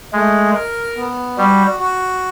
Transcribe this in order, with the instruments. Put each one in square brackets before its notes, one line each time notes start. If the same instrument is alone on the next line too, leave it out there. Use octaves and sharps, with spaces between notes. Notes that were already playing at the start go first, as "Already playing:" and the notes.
[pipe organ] G#3 [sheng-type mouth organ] A3
[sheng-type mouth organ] A#4
B3
[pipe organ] G3 [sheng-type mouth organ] F#4
[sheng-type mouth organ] F#4